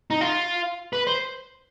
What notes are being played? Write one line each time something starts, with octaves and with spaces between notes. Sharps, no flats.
D#4
F4
B4
C5